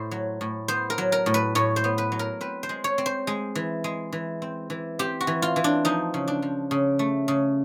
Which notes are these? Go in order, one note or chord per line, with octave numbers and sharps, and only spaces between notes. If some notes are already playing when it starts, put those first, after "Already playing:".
Already playing: A2 C5
F#3
A2
B3 C5
A#4
F#3
A#4
A2
B4
A2 C#5
C5
B3
B4
F#3
A#4
C4 B4
C5
G#3
C#5
C4
C5
G#3
E3
G#3
E3
C4
E3
C4 G4
F#4
E3
F4
E3
D4
F3 D#4
C#3
D4
F3
C#3
A3
C#3